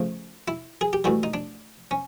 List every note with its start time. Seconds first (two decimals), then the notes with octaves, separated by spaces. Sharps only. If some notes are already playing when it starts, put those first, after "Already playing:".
Already playing: C#3 F3 A3
0.48 E4
0.81 G#4
0.93 G4
1.04 A2 E3 G3 F#4
1.23 D#4
1.34 D4
1.91 C#4